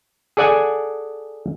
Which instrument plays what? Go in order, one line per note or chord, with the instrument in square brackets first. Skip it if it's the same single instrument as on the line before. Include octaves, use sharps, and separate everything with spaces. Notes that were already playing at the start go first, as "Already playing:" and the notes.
[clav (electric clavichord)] G#4 A4 D5 F#5 G#5